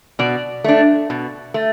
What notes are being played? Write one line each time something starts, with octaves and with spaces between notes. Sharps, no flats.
B2 D5
A3 D4
B2
A3